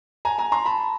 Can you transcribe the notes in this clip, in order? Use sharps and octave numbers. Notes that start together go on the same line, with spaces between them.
G#5 A#5
G#5 A#5
A#5 C6
A5 B5